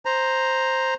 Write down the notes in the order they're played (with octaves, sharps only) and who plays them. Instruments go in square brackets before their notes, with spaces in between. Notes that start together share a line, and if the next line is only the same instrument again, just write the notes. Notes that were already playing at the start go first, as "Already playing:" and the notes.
[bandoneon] C5 A#5